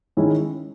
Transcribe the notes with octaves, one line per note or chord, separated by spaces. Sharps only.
D#3 G#3 C#4 E4